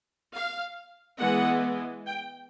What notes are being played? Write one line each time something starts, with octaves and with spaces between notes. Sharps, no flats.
F5
E3 G#3 B3 F#5
G5